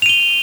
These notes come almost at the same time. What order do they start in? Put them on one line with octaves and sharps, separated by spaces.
F7 D#7 G7